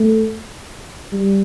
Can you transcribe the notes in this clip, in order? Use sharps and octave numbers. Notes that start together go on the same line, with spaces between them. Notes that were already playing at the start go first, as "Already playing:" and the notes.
Already playing: A3
G3